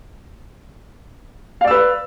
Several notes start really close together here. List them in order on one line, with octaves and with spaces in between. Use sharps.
F5 D5 E6 B4